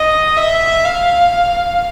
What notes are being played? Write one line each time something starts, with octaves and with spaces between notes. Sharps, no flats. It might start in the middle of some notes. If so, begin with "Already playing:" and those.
Already playing: D#5
E5
F5